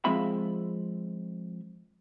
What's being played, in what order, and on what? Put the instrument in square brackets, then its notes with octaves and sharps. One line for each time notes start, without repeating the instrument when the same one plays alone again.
[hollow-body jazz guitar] F3 G#3 C4 F4 E5 B5